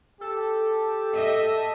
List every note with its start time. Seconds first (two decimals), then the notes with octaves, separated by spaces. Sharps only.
0.21 G4 A4
1.13 D#5 E5